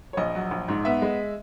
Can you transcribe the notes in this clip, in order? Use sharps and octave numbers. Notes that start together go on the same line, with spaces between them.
C#5
A#1 D#5
F#3
A#1
G#2
B3 E5
G#3